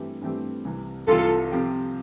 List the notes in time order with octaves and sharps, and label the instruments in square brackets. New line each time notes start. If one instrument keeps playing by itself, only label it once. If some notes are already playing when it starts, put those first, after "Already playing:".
Already playing: [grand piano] G2 E3 A3 C4 G4
G2 E3 A3 C4 G4
C2 C3 E3
[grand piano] C2 C3 E3 [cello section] F4 A4
[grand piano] C3 F3 C4 G4